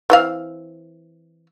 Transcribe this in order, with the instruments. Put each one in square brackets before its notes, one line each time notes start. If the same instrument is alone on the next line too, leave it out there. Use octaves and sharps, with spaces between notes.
[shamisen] E3 C4 F5